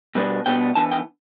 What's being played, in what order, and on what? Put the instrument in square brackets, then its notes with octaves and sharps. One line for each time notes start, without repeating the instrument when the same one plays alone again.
[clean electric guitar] B2 G3 B3 D4
B2 G3 B3 D4 G5
E3 B3 D4 A5
G5